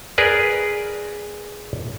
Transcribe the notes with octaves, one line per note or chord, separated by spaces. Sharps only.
G#4 A#4 B4 D5